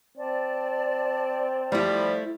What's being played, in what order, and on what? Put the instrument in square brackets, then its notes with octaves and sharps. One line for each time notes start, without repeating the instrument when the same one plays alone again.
[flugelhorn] C4 [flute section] D5 A5
[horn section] F3 G3 [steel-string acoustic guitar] A3 E4